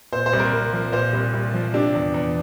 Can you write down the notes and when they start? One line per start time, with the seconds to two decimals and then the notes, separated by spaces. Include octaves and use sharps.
0.12 A#2 C5
0.26 C5
0.33 C2
0.39 A#4
0.53 C2
0.73 F3
0.92 A#2 C5
1.13 C2
1.33 C2
1.54 F3
1.74 C3 D4
1.94 E2
2.14 E2